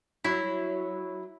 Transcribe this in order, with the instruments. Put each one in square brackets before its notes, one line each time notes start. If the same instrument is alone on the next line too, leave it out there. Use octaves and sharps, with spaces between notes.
[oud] F#3 [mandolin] E4